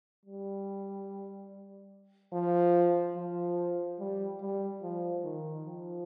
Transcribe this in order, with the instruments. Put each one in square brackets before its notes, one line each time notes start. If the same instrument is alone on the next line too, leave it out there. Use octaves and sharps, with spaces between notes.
[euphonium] G3
F3
F3
G3
G3
F3
D#3
F3